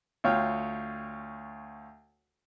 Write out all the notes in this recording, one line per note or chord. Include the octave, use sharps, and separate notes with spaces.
D2 F4 C#5 F5 G5